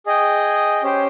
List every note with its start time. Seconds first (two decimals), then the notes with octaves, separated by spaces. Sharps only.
0.06 G#4 D#5 G5
0.83 C#4 G4 C5 G5